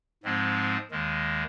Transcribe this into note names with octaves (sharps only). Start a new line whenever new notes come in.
G#2 F3 G#3 C4
D#2 D#3 G#3